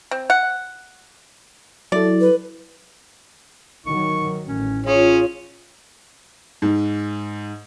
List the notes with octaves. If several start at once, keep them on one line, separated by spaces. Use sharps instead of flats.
C4
F#5
F#3 E4 A4 D5
B4
D#3 F#3 C#6
A1 C#4
C#4 F4 G#4 C#5
G#2